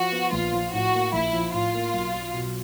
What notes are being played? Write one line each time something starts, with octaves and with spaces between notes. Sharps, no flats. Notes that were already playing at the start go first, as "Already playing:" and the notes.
Already playing: F3 F#4
B3
A#1 F4
F3
A2 F#4
A#3
A#1 E4
F3
A2 F4
A#3
B1
F#3
B2